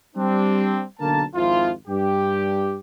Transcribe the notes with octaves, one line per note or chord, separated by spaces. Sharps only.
G3 C4 D4
B1 D3 A#3 A#4 A5
G#1 F2 F3 E4 F4
G2 G4